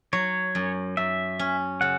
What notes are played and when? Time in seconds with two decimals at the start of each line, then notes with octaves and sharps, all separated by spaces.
0.13 F#3 C#5
0.55 F#2
0.97 F#2 E5
1.39 C#4
1.81 C#3 F#5